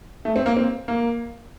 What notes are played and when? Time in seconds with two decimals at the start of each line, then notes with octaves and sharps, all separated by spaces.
0.25 A3
0.36 C4
0.46 A#3
0.57 C4
0.88 A#3